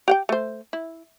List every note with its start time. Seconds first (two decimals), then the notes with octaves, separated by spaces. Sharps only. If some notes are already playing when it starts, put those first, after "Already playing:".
0.08 G4 F#5 G5
0.29 A3 C5
0.73 E4